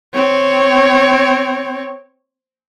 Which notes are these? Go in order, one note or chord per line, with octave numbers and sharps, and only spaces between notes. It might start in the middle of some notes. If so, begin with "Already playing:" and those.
C4 C#5